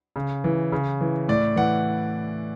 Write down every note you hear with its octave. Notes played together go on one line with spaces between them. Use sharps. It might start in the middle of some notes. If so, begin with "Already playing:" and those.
C#3
E3
C#3
E3
A2 D5
E3 F#5